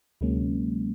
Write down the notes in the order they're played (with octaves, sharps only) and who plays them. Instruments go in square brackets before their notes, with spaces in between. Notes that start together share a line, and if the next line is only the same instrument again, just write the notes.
[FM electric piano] D2 C3 F#3 G#3 A#3 C#4